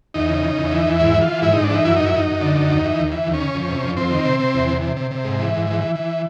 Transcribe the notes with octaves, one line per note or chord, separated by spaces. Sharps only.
E2 D#4
C#3
C#3
E2
E3
E2
G#2 E4
E3
F4
E3
G#2 E4
G#2 D#4
D4
E3 D#4
F#2 E4
F#2 D#4
E4
F#2 D#4
F#2
D3
F#2
D#2
E3
D#2
E3
D#2
C#4
C#3
F2
C3
F2
F2 C4
D#3
C3
C3
E2
C3
C3
C3
C3
G#2
E3
G#2
E3
E3
E3